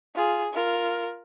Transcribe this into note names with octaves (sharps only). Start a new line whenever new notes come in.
F4 G#4
F4 A#4